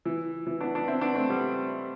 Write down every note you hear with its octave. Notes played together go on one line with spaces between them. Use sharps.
E3
E3
B3 D4
B3 D4
C4 E4
B3 D4
A3 C4
G3 B3